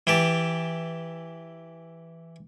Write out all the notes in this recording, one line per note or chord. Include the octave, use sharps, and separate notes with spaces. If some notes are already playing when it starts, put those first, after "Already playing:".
E3 G4 A5